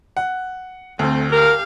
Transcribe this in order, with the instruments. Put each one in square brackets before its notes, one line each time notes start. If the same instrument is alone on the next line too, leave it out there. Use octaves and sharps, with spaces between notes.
[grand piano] F#5
[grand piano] D2 [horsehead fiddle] A3 C4
[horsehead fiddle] G4 F5 [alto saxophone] A#4